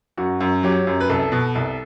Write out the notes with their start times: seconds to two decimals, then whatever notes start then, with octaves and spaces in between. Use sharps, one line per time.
0.17 F#2 F#4
0.40 F#2
0.63 F#3 G4
0.87 F#2
1.00 B4
1.09 C2 A4
1.32 B2
1.55 C2